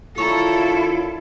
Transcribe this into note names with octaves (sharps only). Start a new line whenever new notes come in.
D#3 D4 E4 F4 A4 C#5 A#5